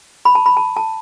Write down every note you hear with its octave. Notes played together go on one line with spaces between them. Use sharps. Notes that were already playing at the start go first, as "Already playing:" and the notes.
B5
A5
B5
A5
A5